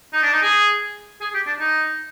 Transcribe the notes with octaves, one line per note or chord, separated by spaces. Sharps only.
D#4
D4
D#4
G#4
G#4
G4
D4
D#4